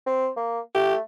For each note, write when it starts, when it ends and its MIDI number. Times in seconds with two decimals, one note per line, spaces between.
0.06 0.29 60
0.37 0.60 58
0.75 1.00 57
0.75 0.95 67